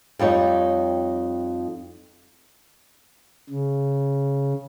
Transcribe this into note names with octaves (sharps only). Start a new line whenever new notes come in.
F2 G3 D#4 C#5
C#3